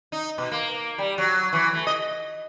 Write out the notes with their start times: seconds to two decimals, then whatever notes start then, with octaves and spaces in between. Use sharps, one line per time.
0.12 D#4
0.38 B2
0.52 A#3
0.98 G3
1.18 F#3
1.53 E3
1.73 A3
1.87 D#5